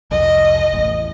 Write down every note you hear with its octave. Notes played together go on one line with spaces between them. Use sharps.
C2 F2 D#5
A1 E2